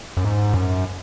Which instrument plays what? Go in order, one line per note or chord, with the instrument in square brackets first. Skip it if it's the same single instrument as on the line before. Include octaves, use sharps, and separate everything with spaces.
[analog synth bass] F#2
G#2
F#2